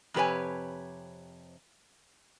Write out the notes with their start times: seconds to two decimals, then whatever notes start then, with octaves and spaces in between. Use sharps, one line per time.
0.14 F2 C3 G4 B4 C#5 G#5